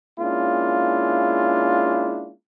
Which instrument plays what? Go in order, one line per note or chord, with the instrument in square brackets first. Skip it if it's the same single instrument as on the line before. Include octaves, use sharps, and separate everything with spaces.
[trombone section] G#3 A#3 C#4 D4 E4 F4